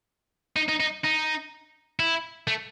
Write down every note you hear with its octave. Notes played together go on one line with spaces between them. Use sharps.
D#4
D#4
D#4
D#4
E4
A3